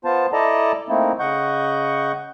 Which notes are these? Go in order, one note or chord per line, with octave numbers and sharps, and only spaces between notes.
B3 F4 C5 A5
E4 A4 D5 D#5 A5 A#5
A3 A#3 C4 D#4 E4
C#3 D#5 F#5 C#6 G6